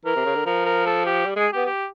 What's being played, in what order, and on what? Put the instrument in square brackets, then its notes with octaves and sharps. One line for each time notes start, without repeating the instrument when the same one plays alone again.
[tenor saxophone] E3 [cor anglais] A#4
[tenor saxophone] C3
C#3
D3
[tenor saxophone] F3 [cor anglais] A#4
[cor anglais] A#4
A4
G4
[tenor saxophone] G3
[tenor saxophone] G#3 [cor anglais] G#4
[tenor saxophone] B3 [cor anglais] G4
[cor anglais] G4